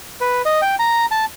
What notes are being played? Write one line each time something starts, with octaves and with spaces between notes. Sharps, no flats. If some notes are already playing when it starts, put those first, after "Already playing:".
B4
D#5
G5
A#5
A5